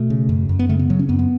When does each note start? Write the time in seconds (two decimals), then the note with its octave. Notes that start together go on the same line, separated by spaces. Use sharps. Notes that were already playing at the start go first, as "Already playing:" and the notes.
Already playing: B2 A3
0.10 C#3
0.29 F#2
0.49 F#2
0.59 B3
0.69 C#3 A3
0.79 B3
0.90 C#3 F#3
0.99 C#4
1.09 F#2 B3
1.19 B3